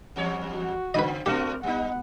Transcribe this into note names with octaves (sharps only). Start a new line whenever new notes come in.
E2 G3 C#5
F#4
C#3 C4 B4 D#5
A3 C4 D4 F#4 G4 A#4
G3 B3 D#4 F#5